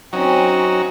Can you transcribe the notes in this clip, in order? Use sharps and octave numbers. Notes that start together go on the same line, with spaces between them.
F#3 C4 C#4 D#4 F#4